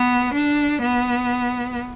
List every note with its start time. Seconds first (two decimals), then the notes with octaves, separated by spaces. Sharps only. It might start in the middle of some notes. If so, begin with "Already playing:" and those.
Already playing: B3
0.34 D4
0.82 B3